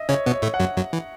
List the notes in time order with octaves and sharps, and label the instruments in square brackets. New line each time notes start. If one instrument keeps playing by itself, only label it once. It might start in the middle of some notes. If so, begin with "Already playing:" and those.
Already playing: [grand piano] D#5 E5
[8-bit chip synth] C#3 C#4 [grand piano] C#5
[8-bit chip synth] B2 B3
[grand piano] C#5
[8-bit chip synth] A2 A3
[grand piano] F#5
[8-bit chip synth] F#2 F#3
F#2 F#3
E3